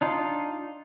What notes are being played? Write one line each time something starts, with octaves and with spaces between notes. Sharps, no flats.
D4 D#4 F4